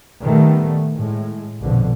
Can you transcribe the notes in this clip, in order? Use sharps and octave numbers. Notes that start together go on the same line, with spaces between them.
A#2 D#3 G3 A3 B3
A2 G#3
A#1 F2 B2 D3